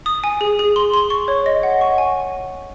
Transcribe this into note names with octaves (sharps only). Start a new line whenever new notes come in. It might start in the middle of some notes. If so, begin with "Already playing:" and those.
D#6
G#5
G#4
G#4
C6
C6
C#6
C#5
D#5
F#5
C#6
G#5